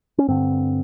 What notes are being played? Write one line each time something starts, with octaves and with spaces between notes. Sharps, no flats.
C#4
G2 D3 C4